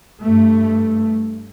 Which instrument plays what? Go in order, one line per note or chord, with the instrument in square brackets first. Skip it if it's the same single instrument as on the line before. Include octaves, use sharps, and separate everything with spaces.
[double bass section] G2 A3